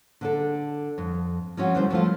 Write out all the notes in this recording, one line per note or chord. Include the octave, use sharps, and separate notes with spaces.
D3 D4 A4
F2
F3 C4 C#4 F4 F#4
D2 E3 G3 C5
F3 A3 F4